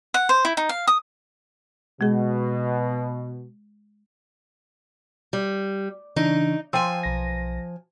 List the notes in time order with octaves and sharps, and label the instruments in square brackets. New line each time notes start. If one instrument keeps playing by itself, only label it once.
[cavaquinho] F#5
C5
E4
D#4
F5
D#6
[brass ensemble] B2 [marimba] G#3 G#4
[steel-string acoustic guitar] G3
[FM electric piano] C#3 E3 D4 [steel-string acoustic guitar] D#4
[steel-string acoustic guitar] F3 G#5 [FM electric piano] G5 C6 E6
[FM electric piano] B1 A#6